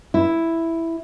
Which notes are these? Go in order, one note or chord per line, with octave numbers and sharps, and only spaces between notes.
E4